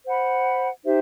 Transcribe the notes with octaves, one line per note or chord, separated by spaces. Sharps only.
C5 F#5 B5
D#4 G4 C5 E5